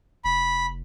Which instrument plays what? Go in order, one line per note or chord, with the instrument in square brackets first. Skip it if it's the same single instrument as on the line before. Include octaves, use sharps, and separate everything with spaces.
[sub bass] F1 [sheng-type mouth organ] B5